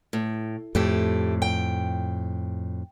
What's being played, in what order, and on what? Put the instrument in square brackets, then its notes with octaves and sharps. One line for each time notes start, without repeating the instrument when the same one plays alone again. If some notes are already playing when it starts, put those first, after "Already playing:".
[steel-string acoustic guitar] A2
[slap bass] F2 A2 [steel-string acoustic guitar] A3 G4
[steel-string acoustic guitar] G5